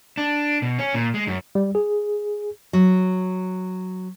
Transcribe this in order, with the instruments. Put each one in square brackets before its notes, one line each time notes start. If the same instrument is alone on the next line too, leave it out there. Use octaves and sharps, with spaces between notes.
[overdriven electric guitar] D4
B2
C#4
A#2
G#3
F#2
[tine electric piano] G3
G#4
[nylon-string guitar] F#3